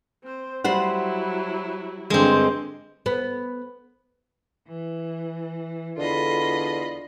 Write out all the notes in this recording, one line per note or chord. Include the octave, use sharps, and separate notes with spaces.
C4 C5
F#3 G3 E4 C5 F#5
G2 D3 G#3 C4
B3
E3
E2 D3 F4 D#5 B5